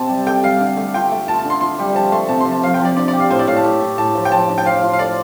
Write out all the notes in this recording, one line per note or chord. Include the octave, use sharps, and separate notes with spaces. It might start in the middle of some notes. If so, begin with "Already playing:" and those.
Already playing: C3 C4 A5
G3
A4 G5
G3 F5
D3
A3
F4 G5
A3
F4 A5
A5
D3
C6
F4 C6
G3
F3 A5
A3 C6
C3 A5
C6
F3
A5
F3 F5
G5
F3
D5
D4 D5
G4 D5
F5
A2 C5
D5
A2 F5
A5
A2
A2
A2 A5
F3
G5
F3 A5
D4
G5
F3 F5
F4
F5
A4 D5